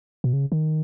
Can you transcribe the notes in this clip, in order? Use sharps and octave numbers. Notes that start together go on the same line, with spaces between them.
B2
C#3
D#3